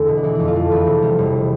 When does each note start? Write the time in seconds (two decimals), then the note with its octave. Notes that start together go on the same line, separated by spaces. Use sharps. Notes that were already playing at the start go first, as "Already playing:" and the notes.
Already playing: E2 D3 A3
0.08 B2
0.18 D4
0.23 E3 E4
0.35 F2 D4
0.48 F4
0.55 A3
0.71 E2 B4
0.87 C3
1.02 G3
1.19 E1